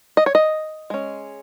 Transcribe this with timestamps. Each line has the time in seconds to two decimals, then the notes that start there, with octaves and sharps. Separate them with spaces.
0.17 D#5
0.26 C#5
0.35 D#5
0.90 G#3 C#4